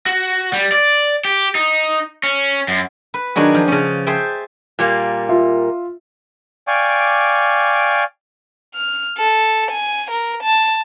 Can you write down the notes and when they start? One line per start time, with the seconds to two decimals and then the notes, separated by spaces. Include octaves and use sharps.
0.06 F#4
0.53 G3
0.72 D5
1.25 G4
1.55 D#4
2.23 C#4
2.68 F#2
3.14 B4
3.35 D#3 F#3 D4 F#4 G#4
3.55 F3
3.68 C#3 C#4
4.06 G#4 C5 E5 G5 A5
4.79 A#2 G3 A#3
5.29 F4 E5
6.67 D5 F5 G5 G#5 C#6 D6
8.75 F6
9.18 A4
9.71 G#5
10.11 A#4
10.44 A5